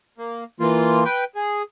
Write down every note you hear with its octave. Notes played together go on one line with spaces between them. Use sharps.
A#3
E3 A#3 F4
B4 G5
G#4